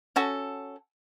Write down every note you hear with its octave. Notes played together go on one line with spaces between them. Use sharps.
C#4 F#4 A4